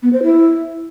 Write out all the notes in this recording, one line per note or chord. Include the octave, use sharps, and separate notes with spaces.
B3
C5
E4